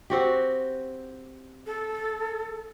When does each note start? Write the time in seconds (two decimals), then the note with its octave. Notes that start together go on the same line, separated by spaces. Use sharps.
0.10 C4 F#4 G4
1.66 A4